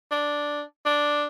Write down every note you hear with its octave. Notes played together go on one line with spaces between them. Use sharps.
D4
D4